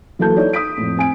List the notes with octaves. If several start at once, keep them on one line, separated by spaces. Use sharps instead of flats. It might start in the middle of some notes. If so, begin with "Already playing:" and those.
E3 F#3 A#3 A4 A5 G6
D#4 E4 A4 C#5 D5
D#6 B6 D7
F2 A2
C4 G#5 D7